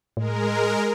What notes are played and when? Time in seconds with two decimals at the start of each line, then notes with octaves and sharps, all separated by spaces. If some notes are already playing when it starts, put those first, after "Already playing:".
0.17 A2 G#3 A#4